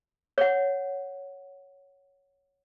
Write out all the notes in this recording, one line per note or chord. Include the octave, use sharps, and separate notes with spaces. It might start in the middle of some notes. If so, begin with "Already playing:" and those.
C#5 F#5